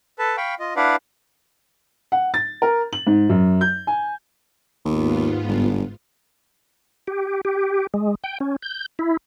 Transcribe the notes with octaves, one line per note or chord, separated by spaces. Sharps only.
A4 B4 A5
F5 G5 B5 C#6
F4 D#5
D4 E4 B4 D5 F5 F#5
F#5
A6
A#4
F#7
G#2
F#2
G6
G#5
D#2 G#2 B3 F4
G1
G4
G4
G#3
G5
C#4
G6
E4